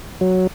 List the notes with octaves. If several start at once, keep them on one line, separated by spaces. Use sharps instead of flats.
F#3